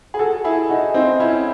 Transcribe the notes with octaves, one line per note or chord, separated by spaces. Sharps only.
G#4
F#4 A4
E4 G#4
D#4 F#4
C4 D#4
C#4 E4